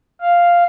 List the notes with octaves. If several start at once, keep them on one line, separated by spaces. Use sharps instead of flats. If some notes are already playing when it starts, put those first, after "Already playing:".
F5